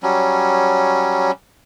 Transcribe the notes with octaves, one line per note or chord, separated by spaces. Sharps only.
F#3 G3 C#4